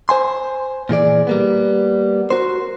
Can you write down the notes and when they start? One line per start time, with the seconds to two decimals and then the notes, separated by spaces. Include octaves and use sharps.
0.09 C5 G#5 C6
0.89 A#2 E3 G#4 D5
1.27 G3 A#3 B3
2.30 F#4 A#4 C5